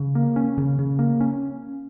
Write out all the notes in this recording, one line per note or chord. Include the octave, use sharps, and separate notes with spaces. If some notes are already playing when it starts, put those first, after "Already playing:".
Already playing: C#3
A#3
C#4
C#3
C#3
A#3
C#4